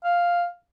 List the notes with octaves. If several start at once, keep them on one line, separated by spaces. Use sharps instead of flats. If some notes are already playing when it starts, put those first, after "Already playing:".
F5